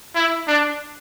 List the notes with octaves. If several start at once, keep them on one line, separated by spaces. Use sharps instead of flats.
E4
D4